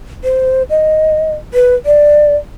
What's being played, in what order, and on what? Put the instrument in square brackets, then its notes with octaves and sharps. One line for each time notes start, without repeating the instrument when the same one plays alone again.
[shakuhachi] C5
D#5
B4
D5